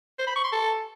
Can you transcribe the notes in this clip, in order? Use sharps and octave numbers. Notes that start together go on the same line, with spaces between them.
C5
B5
C#6
C6
A4